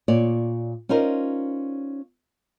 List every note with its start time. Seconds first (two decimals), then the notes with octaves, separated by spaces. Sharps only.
0.08 A#2 C#5 D5
0.89 C#4 D#4 F4 A#4 C5 D5